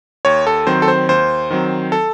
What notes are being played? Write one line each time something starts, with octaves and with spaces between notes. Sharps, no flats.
D#2 C#5
A4
D#3 F#3 C4 C5
A4
C5
D#2 C5
D#3 F#3 C4
A4